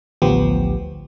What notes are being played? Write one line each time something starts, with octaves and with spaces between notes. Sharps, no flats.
A1 D2 F3 B3 G4